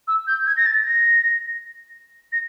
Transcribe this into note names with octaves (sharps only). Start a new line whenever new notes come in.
E6
G6
G#6
A#6
A6
A#6
A#6